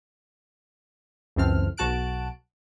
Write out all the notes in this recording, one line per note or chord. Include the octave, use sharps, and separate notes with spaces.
C#2 F#2 E3 C4 A4 F6
B1 F#4 A5 F#6 D7